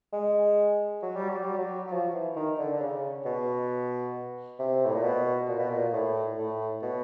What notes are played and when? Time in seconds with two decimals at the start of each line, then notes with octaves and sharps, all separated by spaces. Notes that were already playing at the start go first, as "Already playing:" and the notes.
0.13 G#3
1.02 F#3
1.16 G3
1.30 F#3
1.44 G3
1.58 F#3
1.87 F#3
1.92 F3
2.14 E3
2.36 D#3
2.58 D3
2.73 D3
2.81 C#3
3.25 B2
4.59 C3
4.85 A2
4.95 A#2
5.03 B2
5.48 A#2
5.59 B2
5.70 A#2
5.93 A2
6.38 A2
6.82 B2